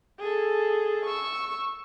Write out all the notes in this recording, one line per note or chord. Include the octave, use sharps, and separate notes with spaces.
G#4 A4
C#6 E6